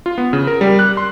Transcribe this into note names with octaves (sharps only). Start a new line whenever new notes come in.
F4
B3
C#3
A#4
G3
F#6
C6